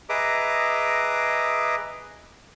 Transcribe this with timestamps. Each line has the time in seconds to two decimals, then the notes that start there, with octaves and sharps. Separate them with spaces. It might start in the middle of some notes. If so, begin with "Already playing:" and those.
0.09 G#4 B4 D#5 E5 A#5 D6